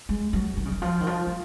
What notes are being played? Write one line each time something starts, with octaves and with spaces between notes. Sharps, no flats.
G#3
F#3
D#3
C#3
D#3
F3
D#3
F3
F3